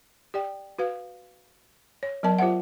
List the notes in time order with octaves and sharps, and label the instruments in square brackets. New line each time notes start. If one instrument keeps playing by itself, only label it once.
[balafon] G4 D5 G5
F#4 B4 F5
C#5
F#3 B3 A#4 D5 A5
F4 G4 C5 E5 F#5